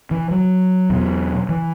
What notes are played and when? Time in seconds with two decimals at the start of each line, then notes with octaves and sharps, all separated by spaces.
0.11 E3
0.31 F#3
0.90 E2 B2
1.49 E3